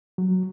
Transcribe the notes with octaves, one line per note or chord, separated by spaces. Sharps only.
F#3